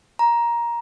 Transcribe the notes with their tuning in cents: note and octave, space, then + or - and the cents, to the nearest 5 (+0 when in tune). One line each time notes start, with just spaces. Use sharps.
A#5 +15